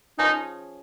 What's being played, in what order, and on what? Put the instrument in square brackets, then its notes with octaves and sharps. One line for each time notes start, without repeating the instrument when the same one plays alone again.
[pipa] F3 C#4 G#4 [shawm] D#4